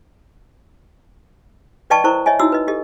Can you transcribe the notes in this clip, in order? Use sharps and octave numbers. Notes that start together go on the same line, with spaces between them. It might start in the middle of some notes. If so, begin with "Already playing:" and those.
B4 D5 D#5 G5 A5 C#6
E4 A#4 C5 A#5 C#6
C#5 D#5 E5 G#5
D#4 E4 F#4 C#5 D#6 E6
B4 D#5
G4 A4 D#5